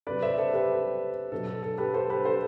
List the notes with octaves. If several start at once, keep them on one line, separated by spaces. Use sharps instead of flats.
C3 F#3 B4 D5
C5 E5
A4 C5
G4 B4
B2 F#3 A4
A4
A4
G4 B4
A4 C5
G4 B4
A4 C5